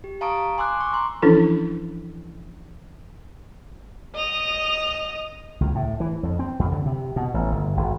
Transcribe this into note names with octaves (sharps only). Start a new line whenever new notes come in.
G4
F5 A5 A#5 C#6 D#6 D7
G#5 C6 D6 E6 F#6
C#6 D6
A#5 C6
E3 F3 C#4 D4 E4 A4
D#5 D#6 F7
C#2
A2
E3
F2
C4
F2
D3
C3
B2
A1
G1
G#1